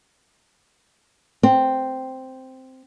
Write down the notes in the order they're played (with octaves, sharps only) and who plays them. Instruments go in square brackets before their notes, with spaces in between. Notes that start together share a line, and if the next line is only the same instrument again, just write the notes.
[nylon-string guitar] C4